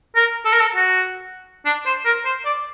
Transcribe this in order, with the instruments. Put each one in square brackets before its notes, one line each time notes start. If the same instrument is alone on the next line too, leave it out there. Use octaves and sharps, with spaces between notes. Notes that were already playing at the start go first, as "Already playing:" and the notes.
[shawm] A#4
A4
A#4
A4
F#4
D4
C5
A#4
C5
D5